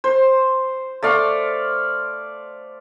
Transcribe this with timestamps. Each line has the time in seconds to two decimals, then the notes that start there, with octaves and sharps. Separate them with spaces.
0.04 C5
1.03 A3 D5 F5